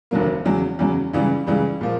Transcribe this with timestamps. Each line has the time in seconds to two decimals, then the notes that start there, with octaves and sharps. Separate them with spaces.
0.11 F1 D#2 D3 F#3 A#3
0.45 E2 C#3 F#3
0.79 E2 C#3 F#3
1.13 C#2 C#3 E3 G3
1.47 C#2 C#3 E3 G3
1.81 A#2 F3 A#3